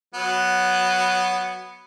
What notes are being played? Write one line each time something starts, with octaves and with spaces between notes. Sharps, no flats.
F#3 B3